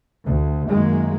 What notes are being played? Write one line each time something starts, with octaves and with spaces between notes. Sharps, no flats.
D2
F#2 D#3 G#3 A#3